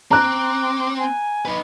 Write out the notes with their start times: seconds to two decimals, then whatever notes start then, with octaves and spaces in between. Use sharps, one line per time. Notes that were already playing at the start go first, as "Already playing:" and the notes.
0.11 C4 A#5 D6 F#6
0.99 G#5
1.45 D#4 B4